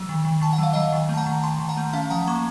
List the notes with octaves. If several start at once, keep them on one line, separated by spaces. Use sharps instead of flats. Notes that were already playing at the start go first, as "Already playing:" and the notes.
Already playing: F#3
D#3
D#3
D#3 A5
F#5
F#3 F5
F#3 D#5 F#5
D#3
A3 A5
F#5 A#5
D#3
D#3 A5 C6
D#3
F#5 A#5
A3
C#4 F5 A5
F3 F#5 A#5
A#3 A#5 C#6